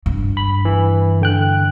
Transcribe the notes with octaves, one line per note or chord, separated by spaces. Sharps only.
G2
B5
E3
D3 G5 F#6